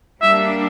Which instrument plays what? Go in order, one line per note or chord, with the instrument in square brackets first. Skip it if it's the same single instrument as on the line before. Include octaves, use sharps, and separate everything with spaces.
[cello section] G3 A#3 D4 [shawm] E5